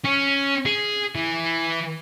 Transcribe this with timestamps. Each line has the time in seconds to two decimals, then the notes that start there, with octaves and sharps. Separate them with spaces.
0.04 C#4
0.66 G#4
1.15 E3